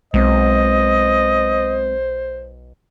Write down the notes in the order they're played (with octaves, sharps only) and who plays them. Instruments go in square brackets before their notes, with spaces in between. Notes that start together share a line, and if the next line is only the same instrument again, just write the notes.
[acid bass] B1 [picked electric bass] G#3 C4 [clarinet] C5 [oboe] D#5